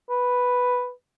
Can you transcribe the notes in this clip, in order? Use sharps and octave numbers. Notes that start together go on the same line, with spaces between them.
B4